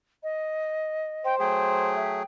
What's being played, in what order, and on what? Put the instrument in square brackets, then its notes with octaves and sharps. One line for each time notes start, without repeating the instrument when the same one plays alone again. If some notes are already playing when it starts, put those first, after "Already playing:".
[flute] D#5
[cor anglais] C5 [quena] G5
[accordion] F#3 A3 G#4 [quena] G5
[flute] E5